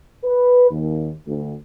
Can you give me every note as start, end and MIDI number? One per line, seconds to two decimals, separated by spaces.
0.24 0.67 71
0.71 1.12 39
1.26 1.54 38